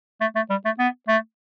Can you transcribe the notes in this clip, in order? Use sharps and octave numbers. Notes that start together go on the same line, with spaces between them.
A3
A3
G3
A3
B3
A3